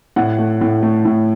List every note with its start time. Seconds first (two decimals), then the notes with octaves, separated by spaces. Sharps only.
0.16 A2 F#5
0.38 A3
0.61 A2
0.82 A3
1.05 A2